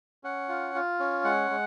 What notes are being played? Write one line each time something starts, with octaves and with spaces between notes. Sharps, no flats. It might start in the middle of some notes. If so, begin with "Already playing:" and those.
C#4 F#5
F4
F4
C#4
G#3 F#5
G#3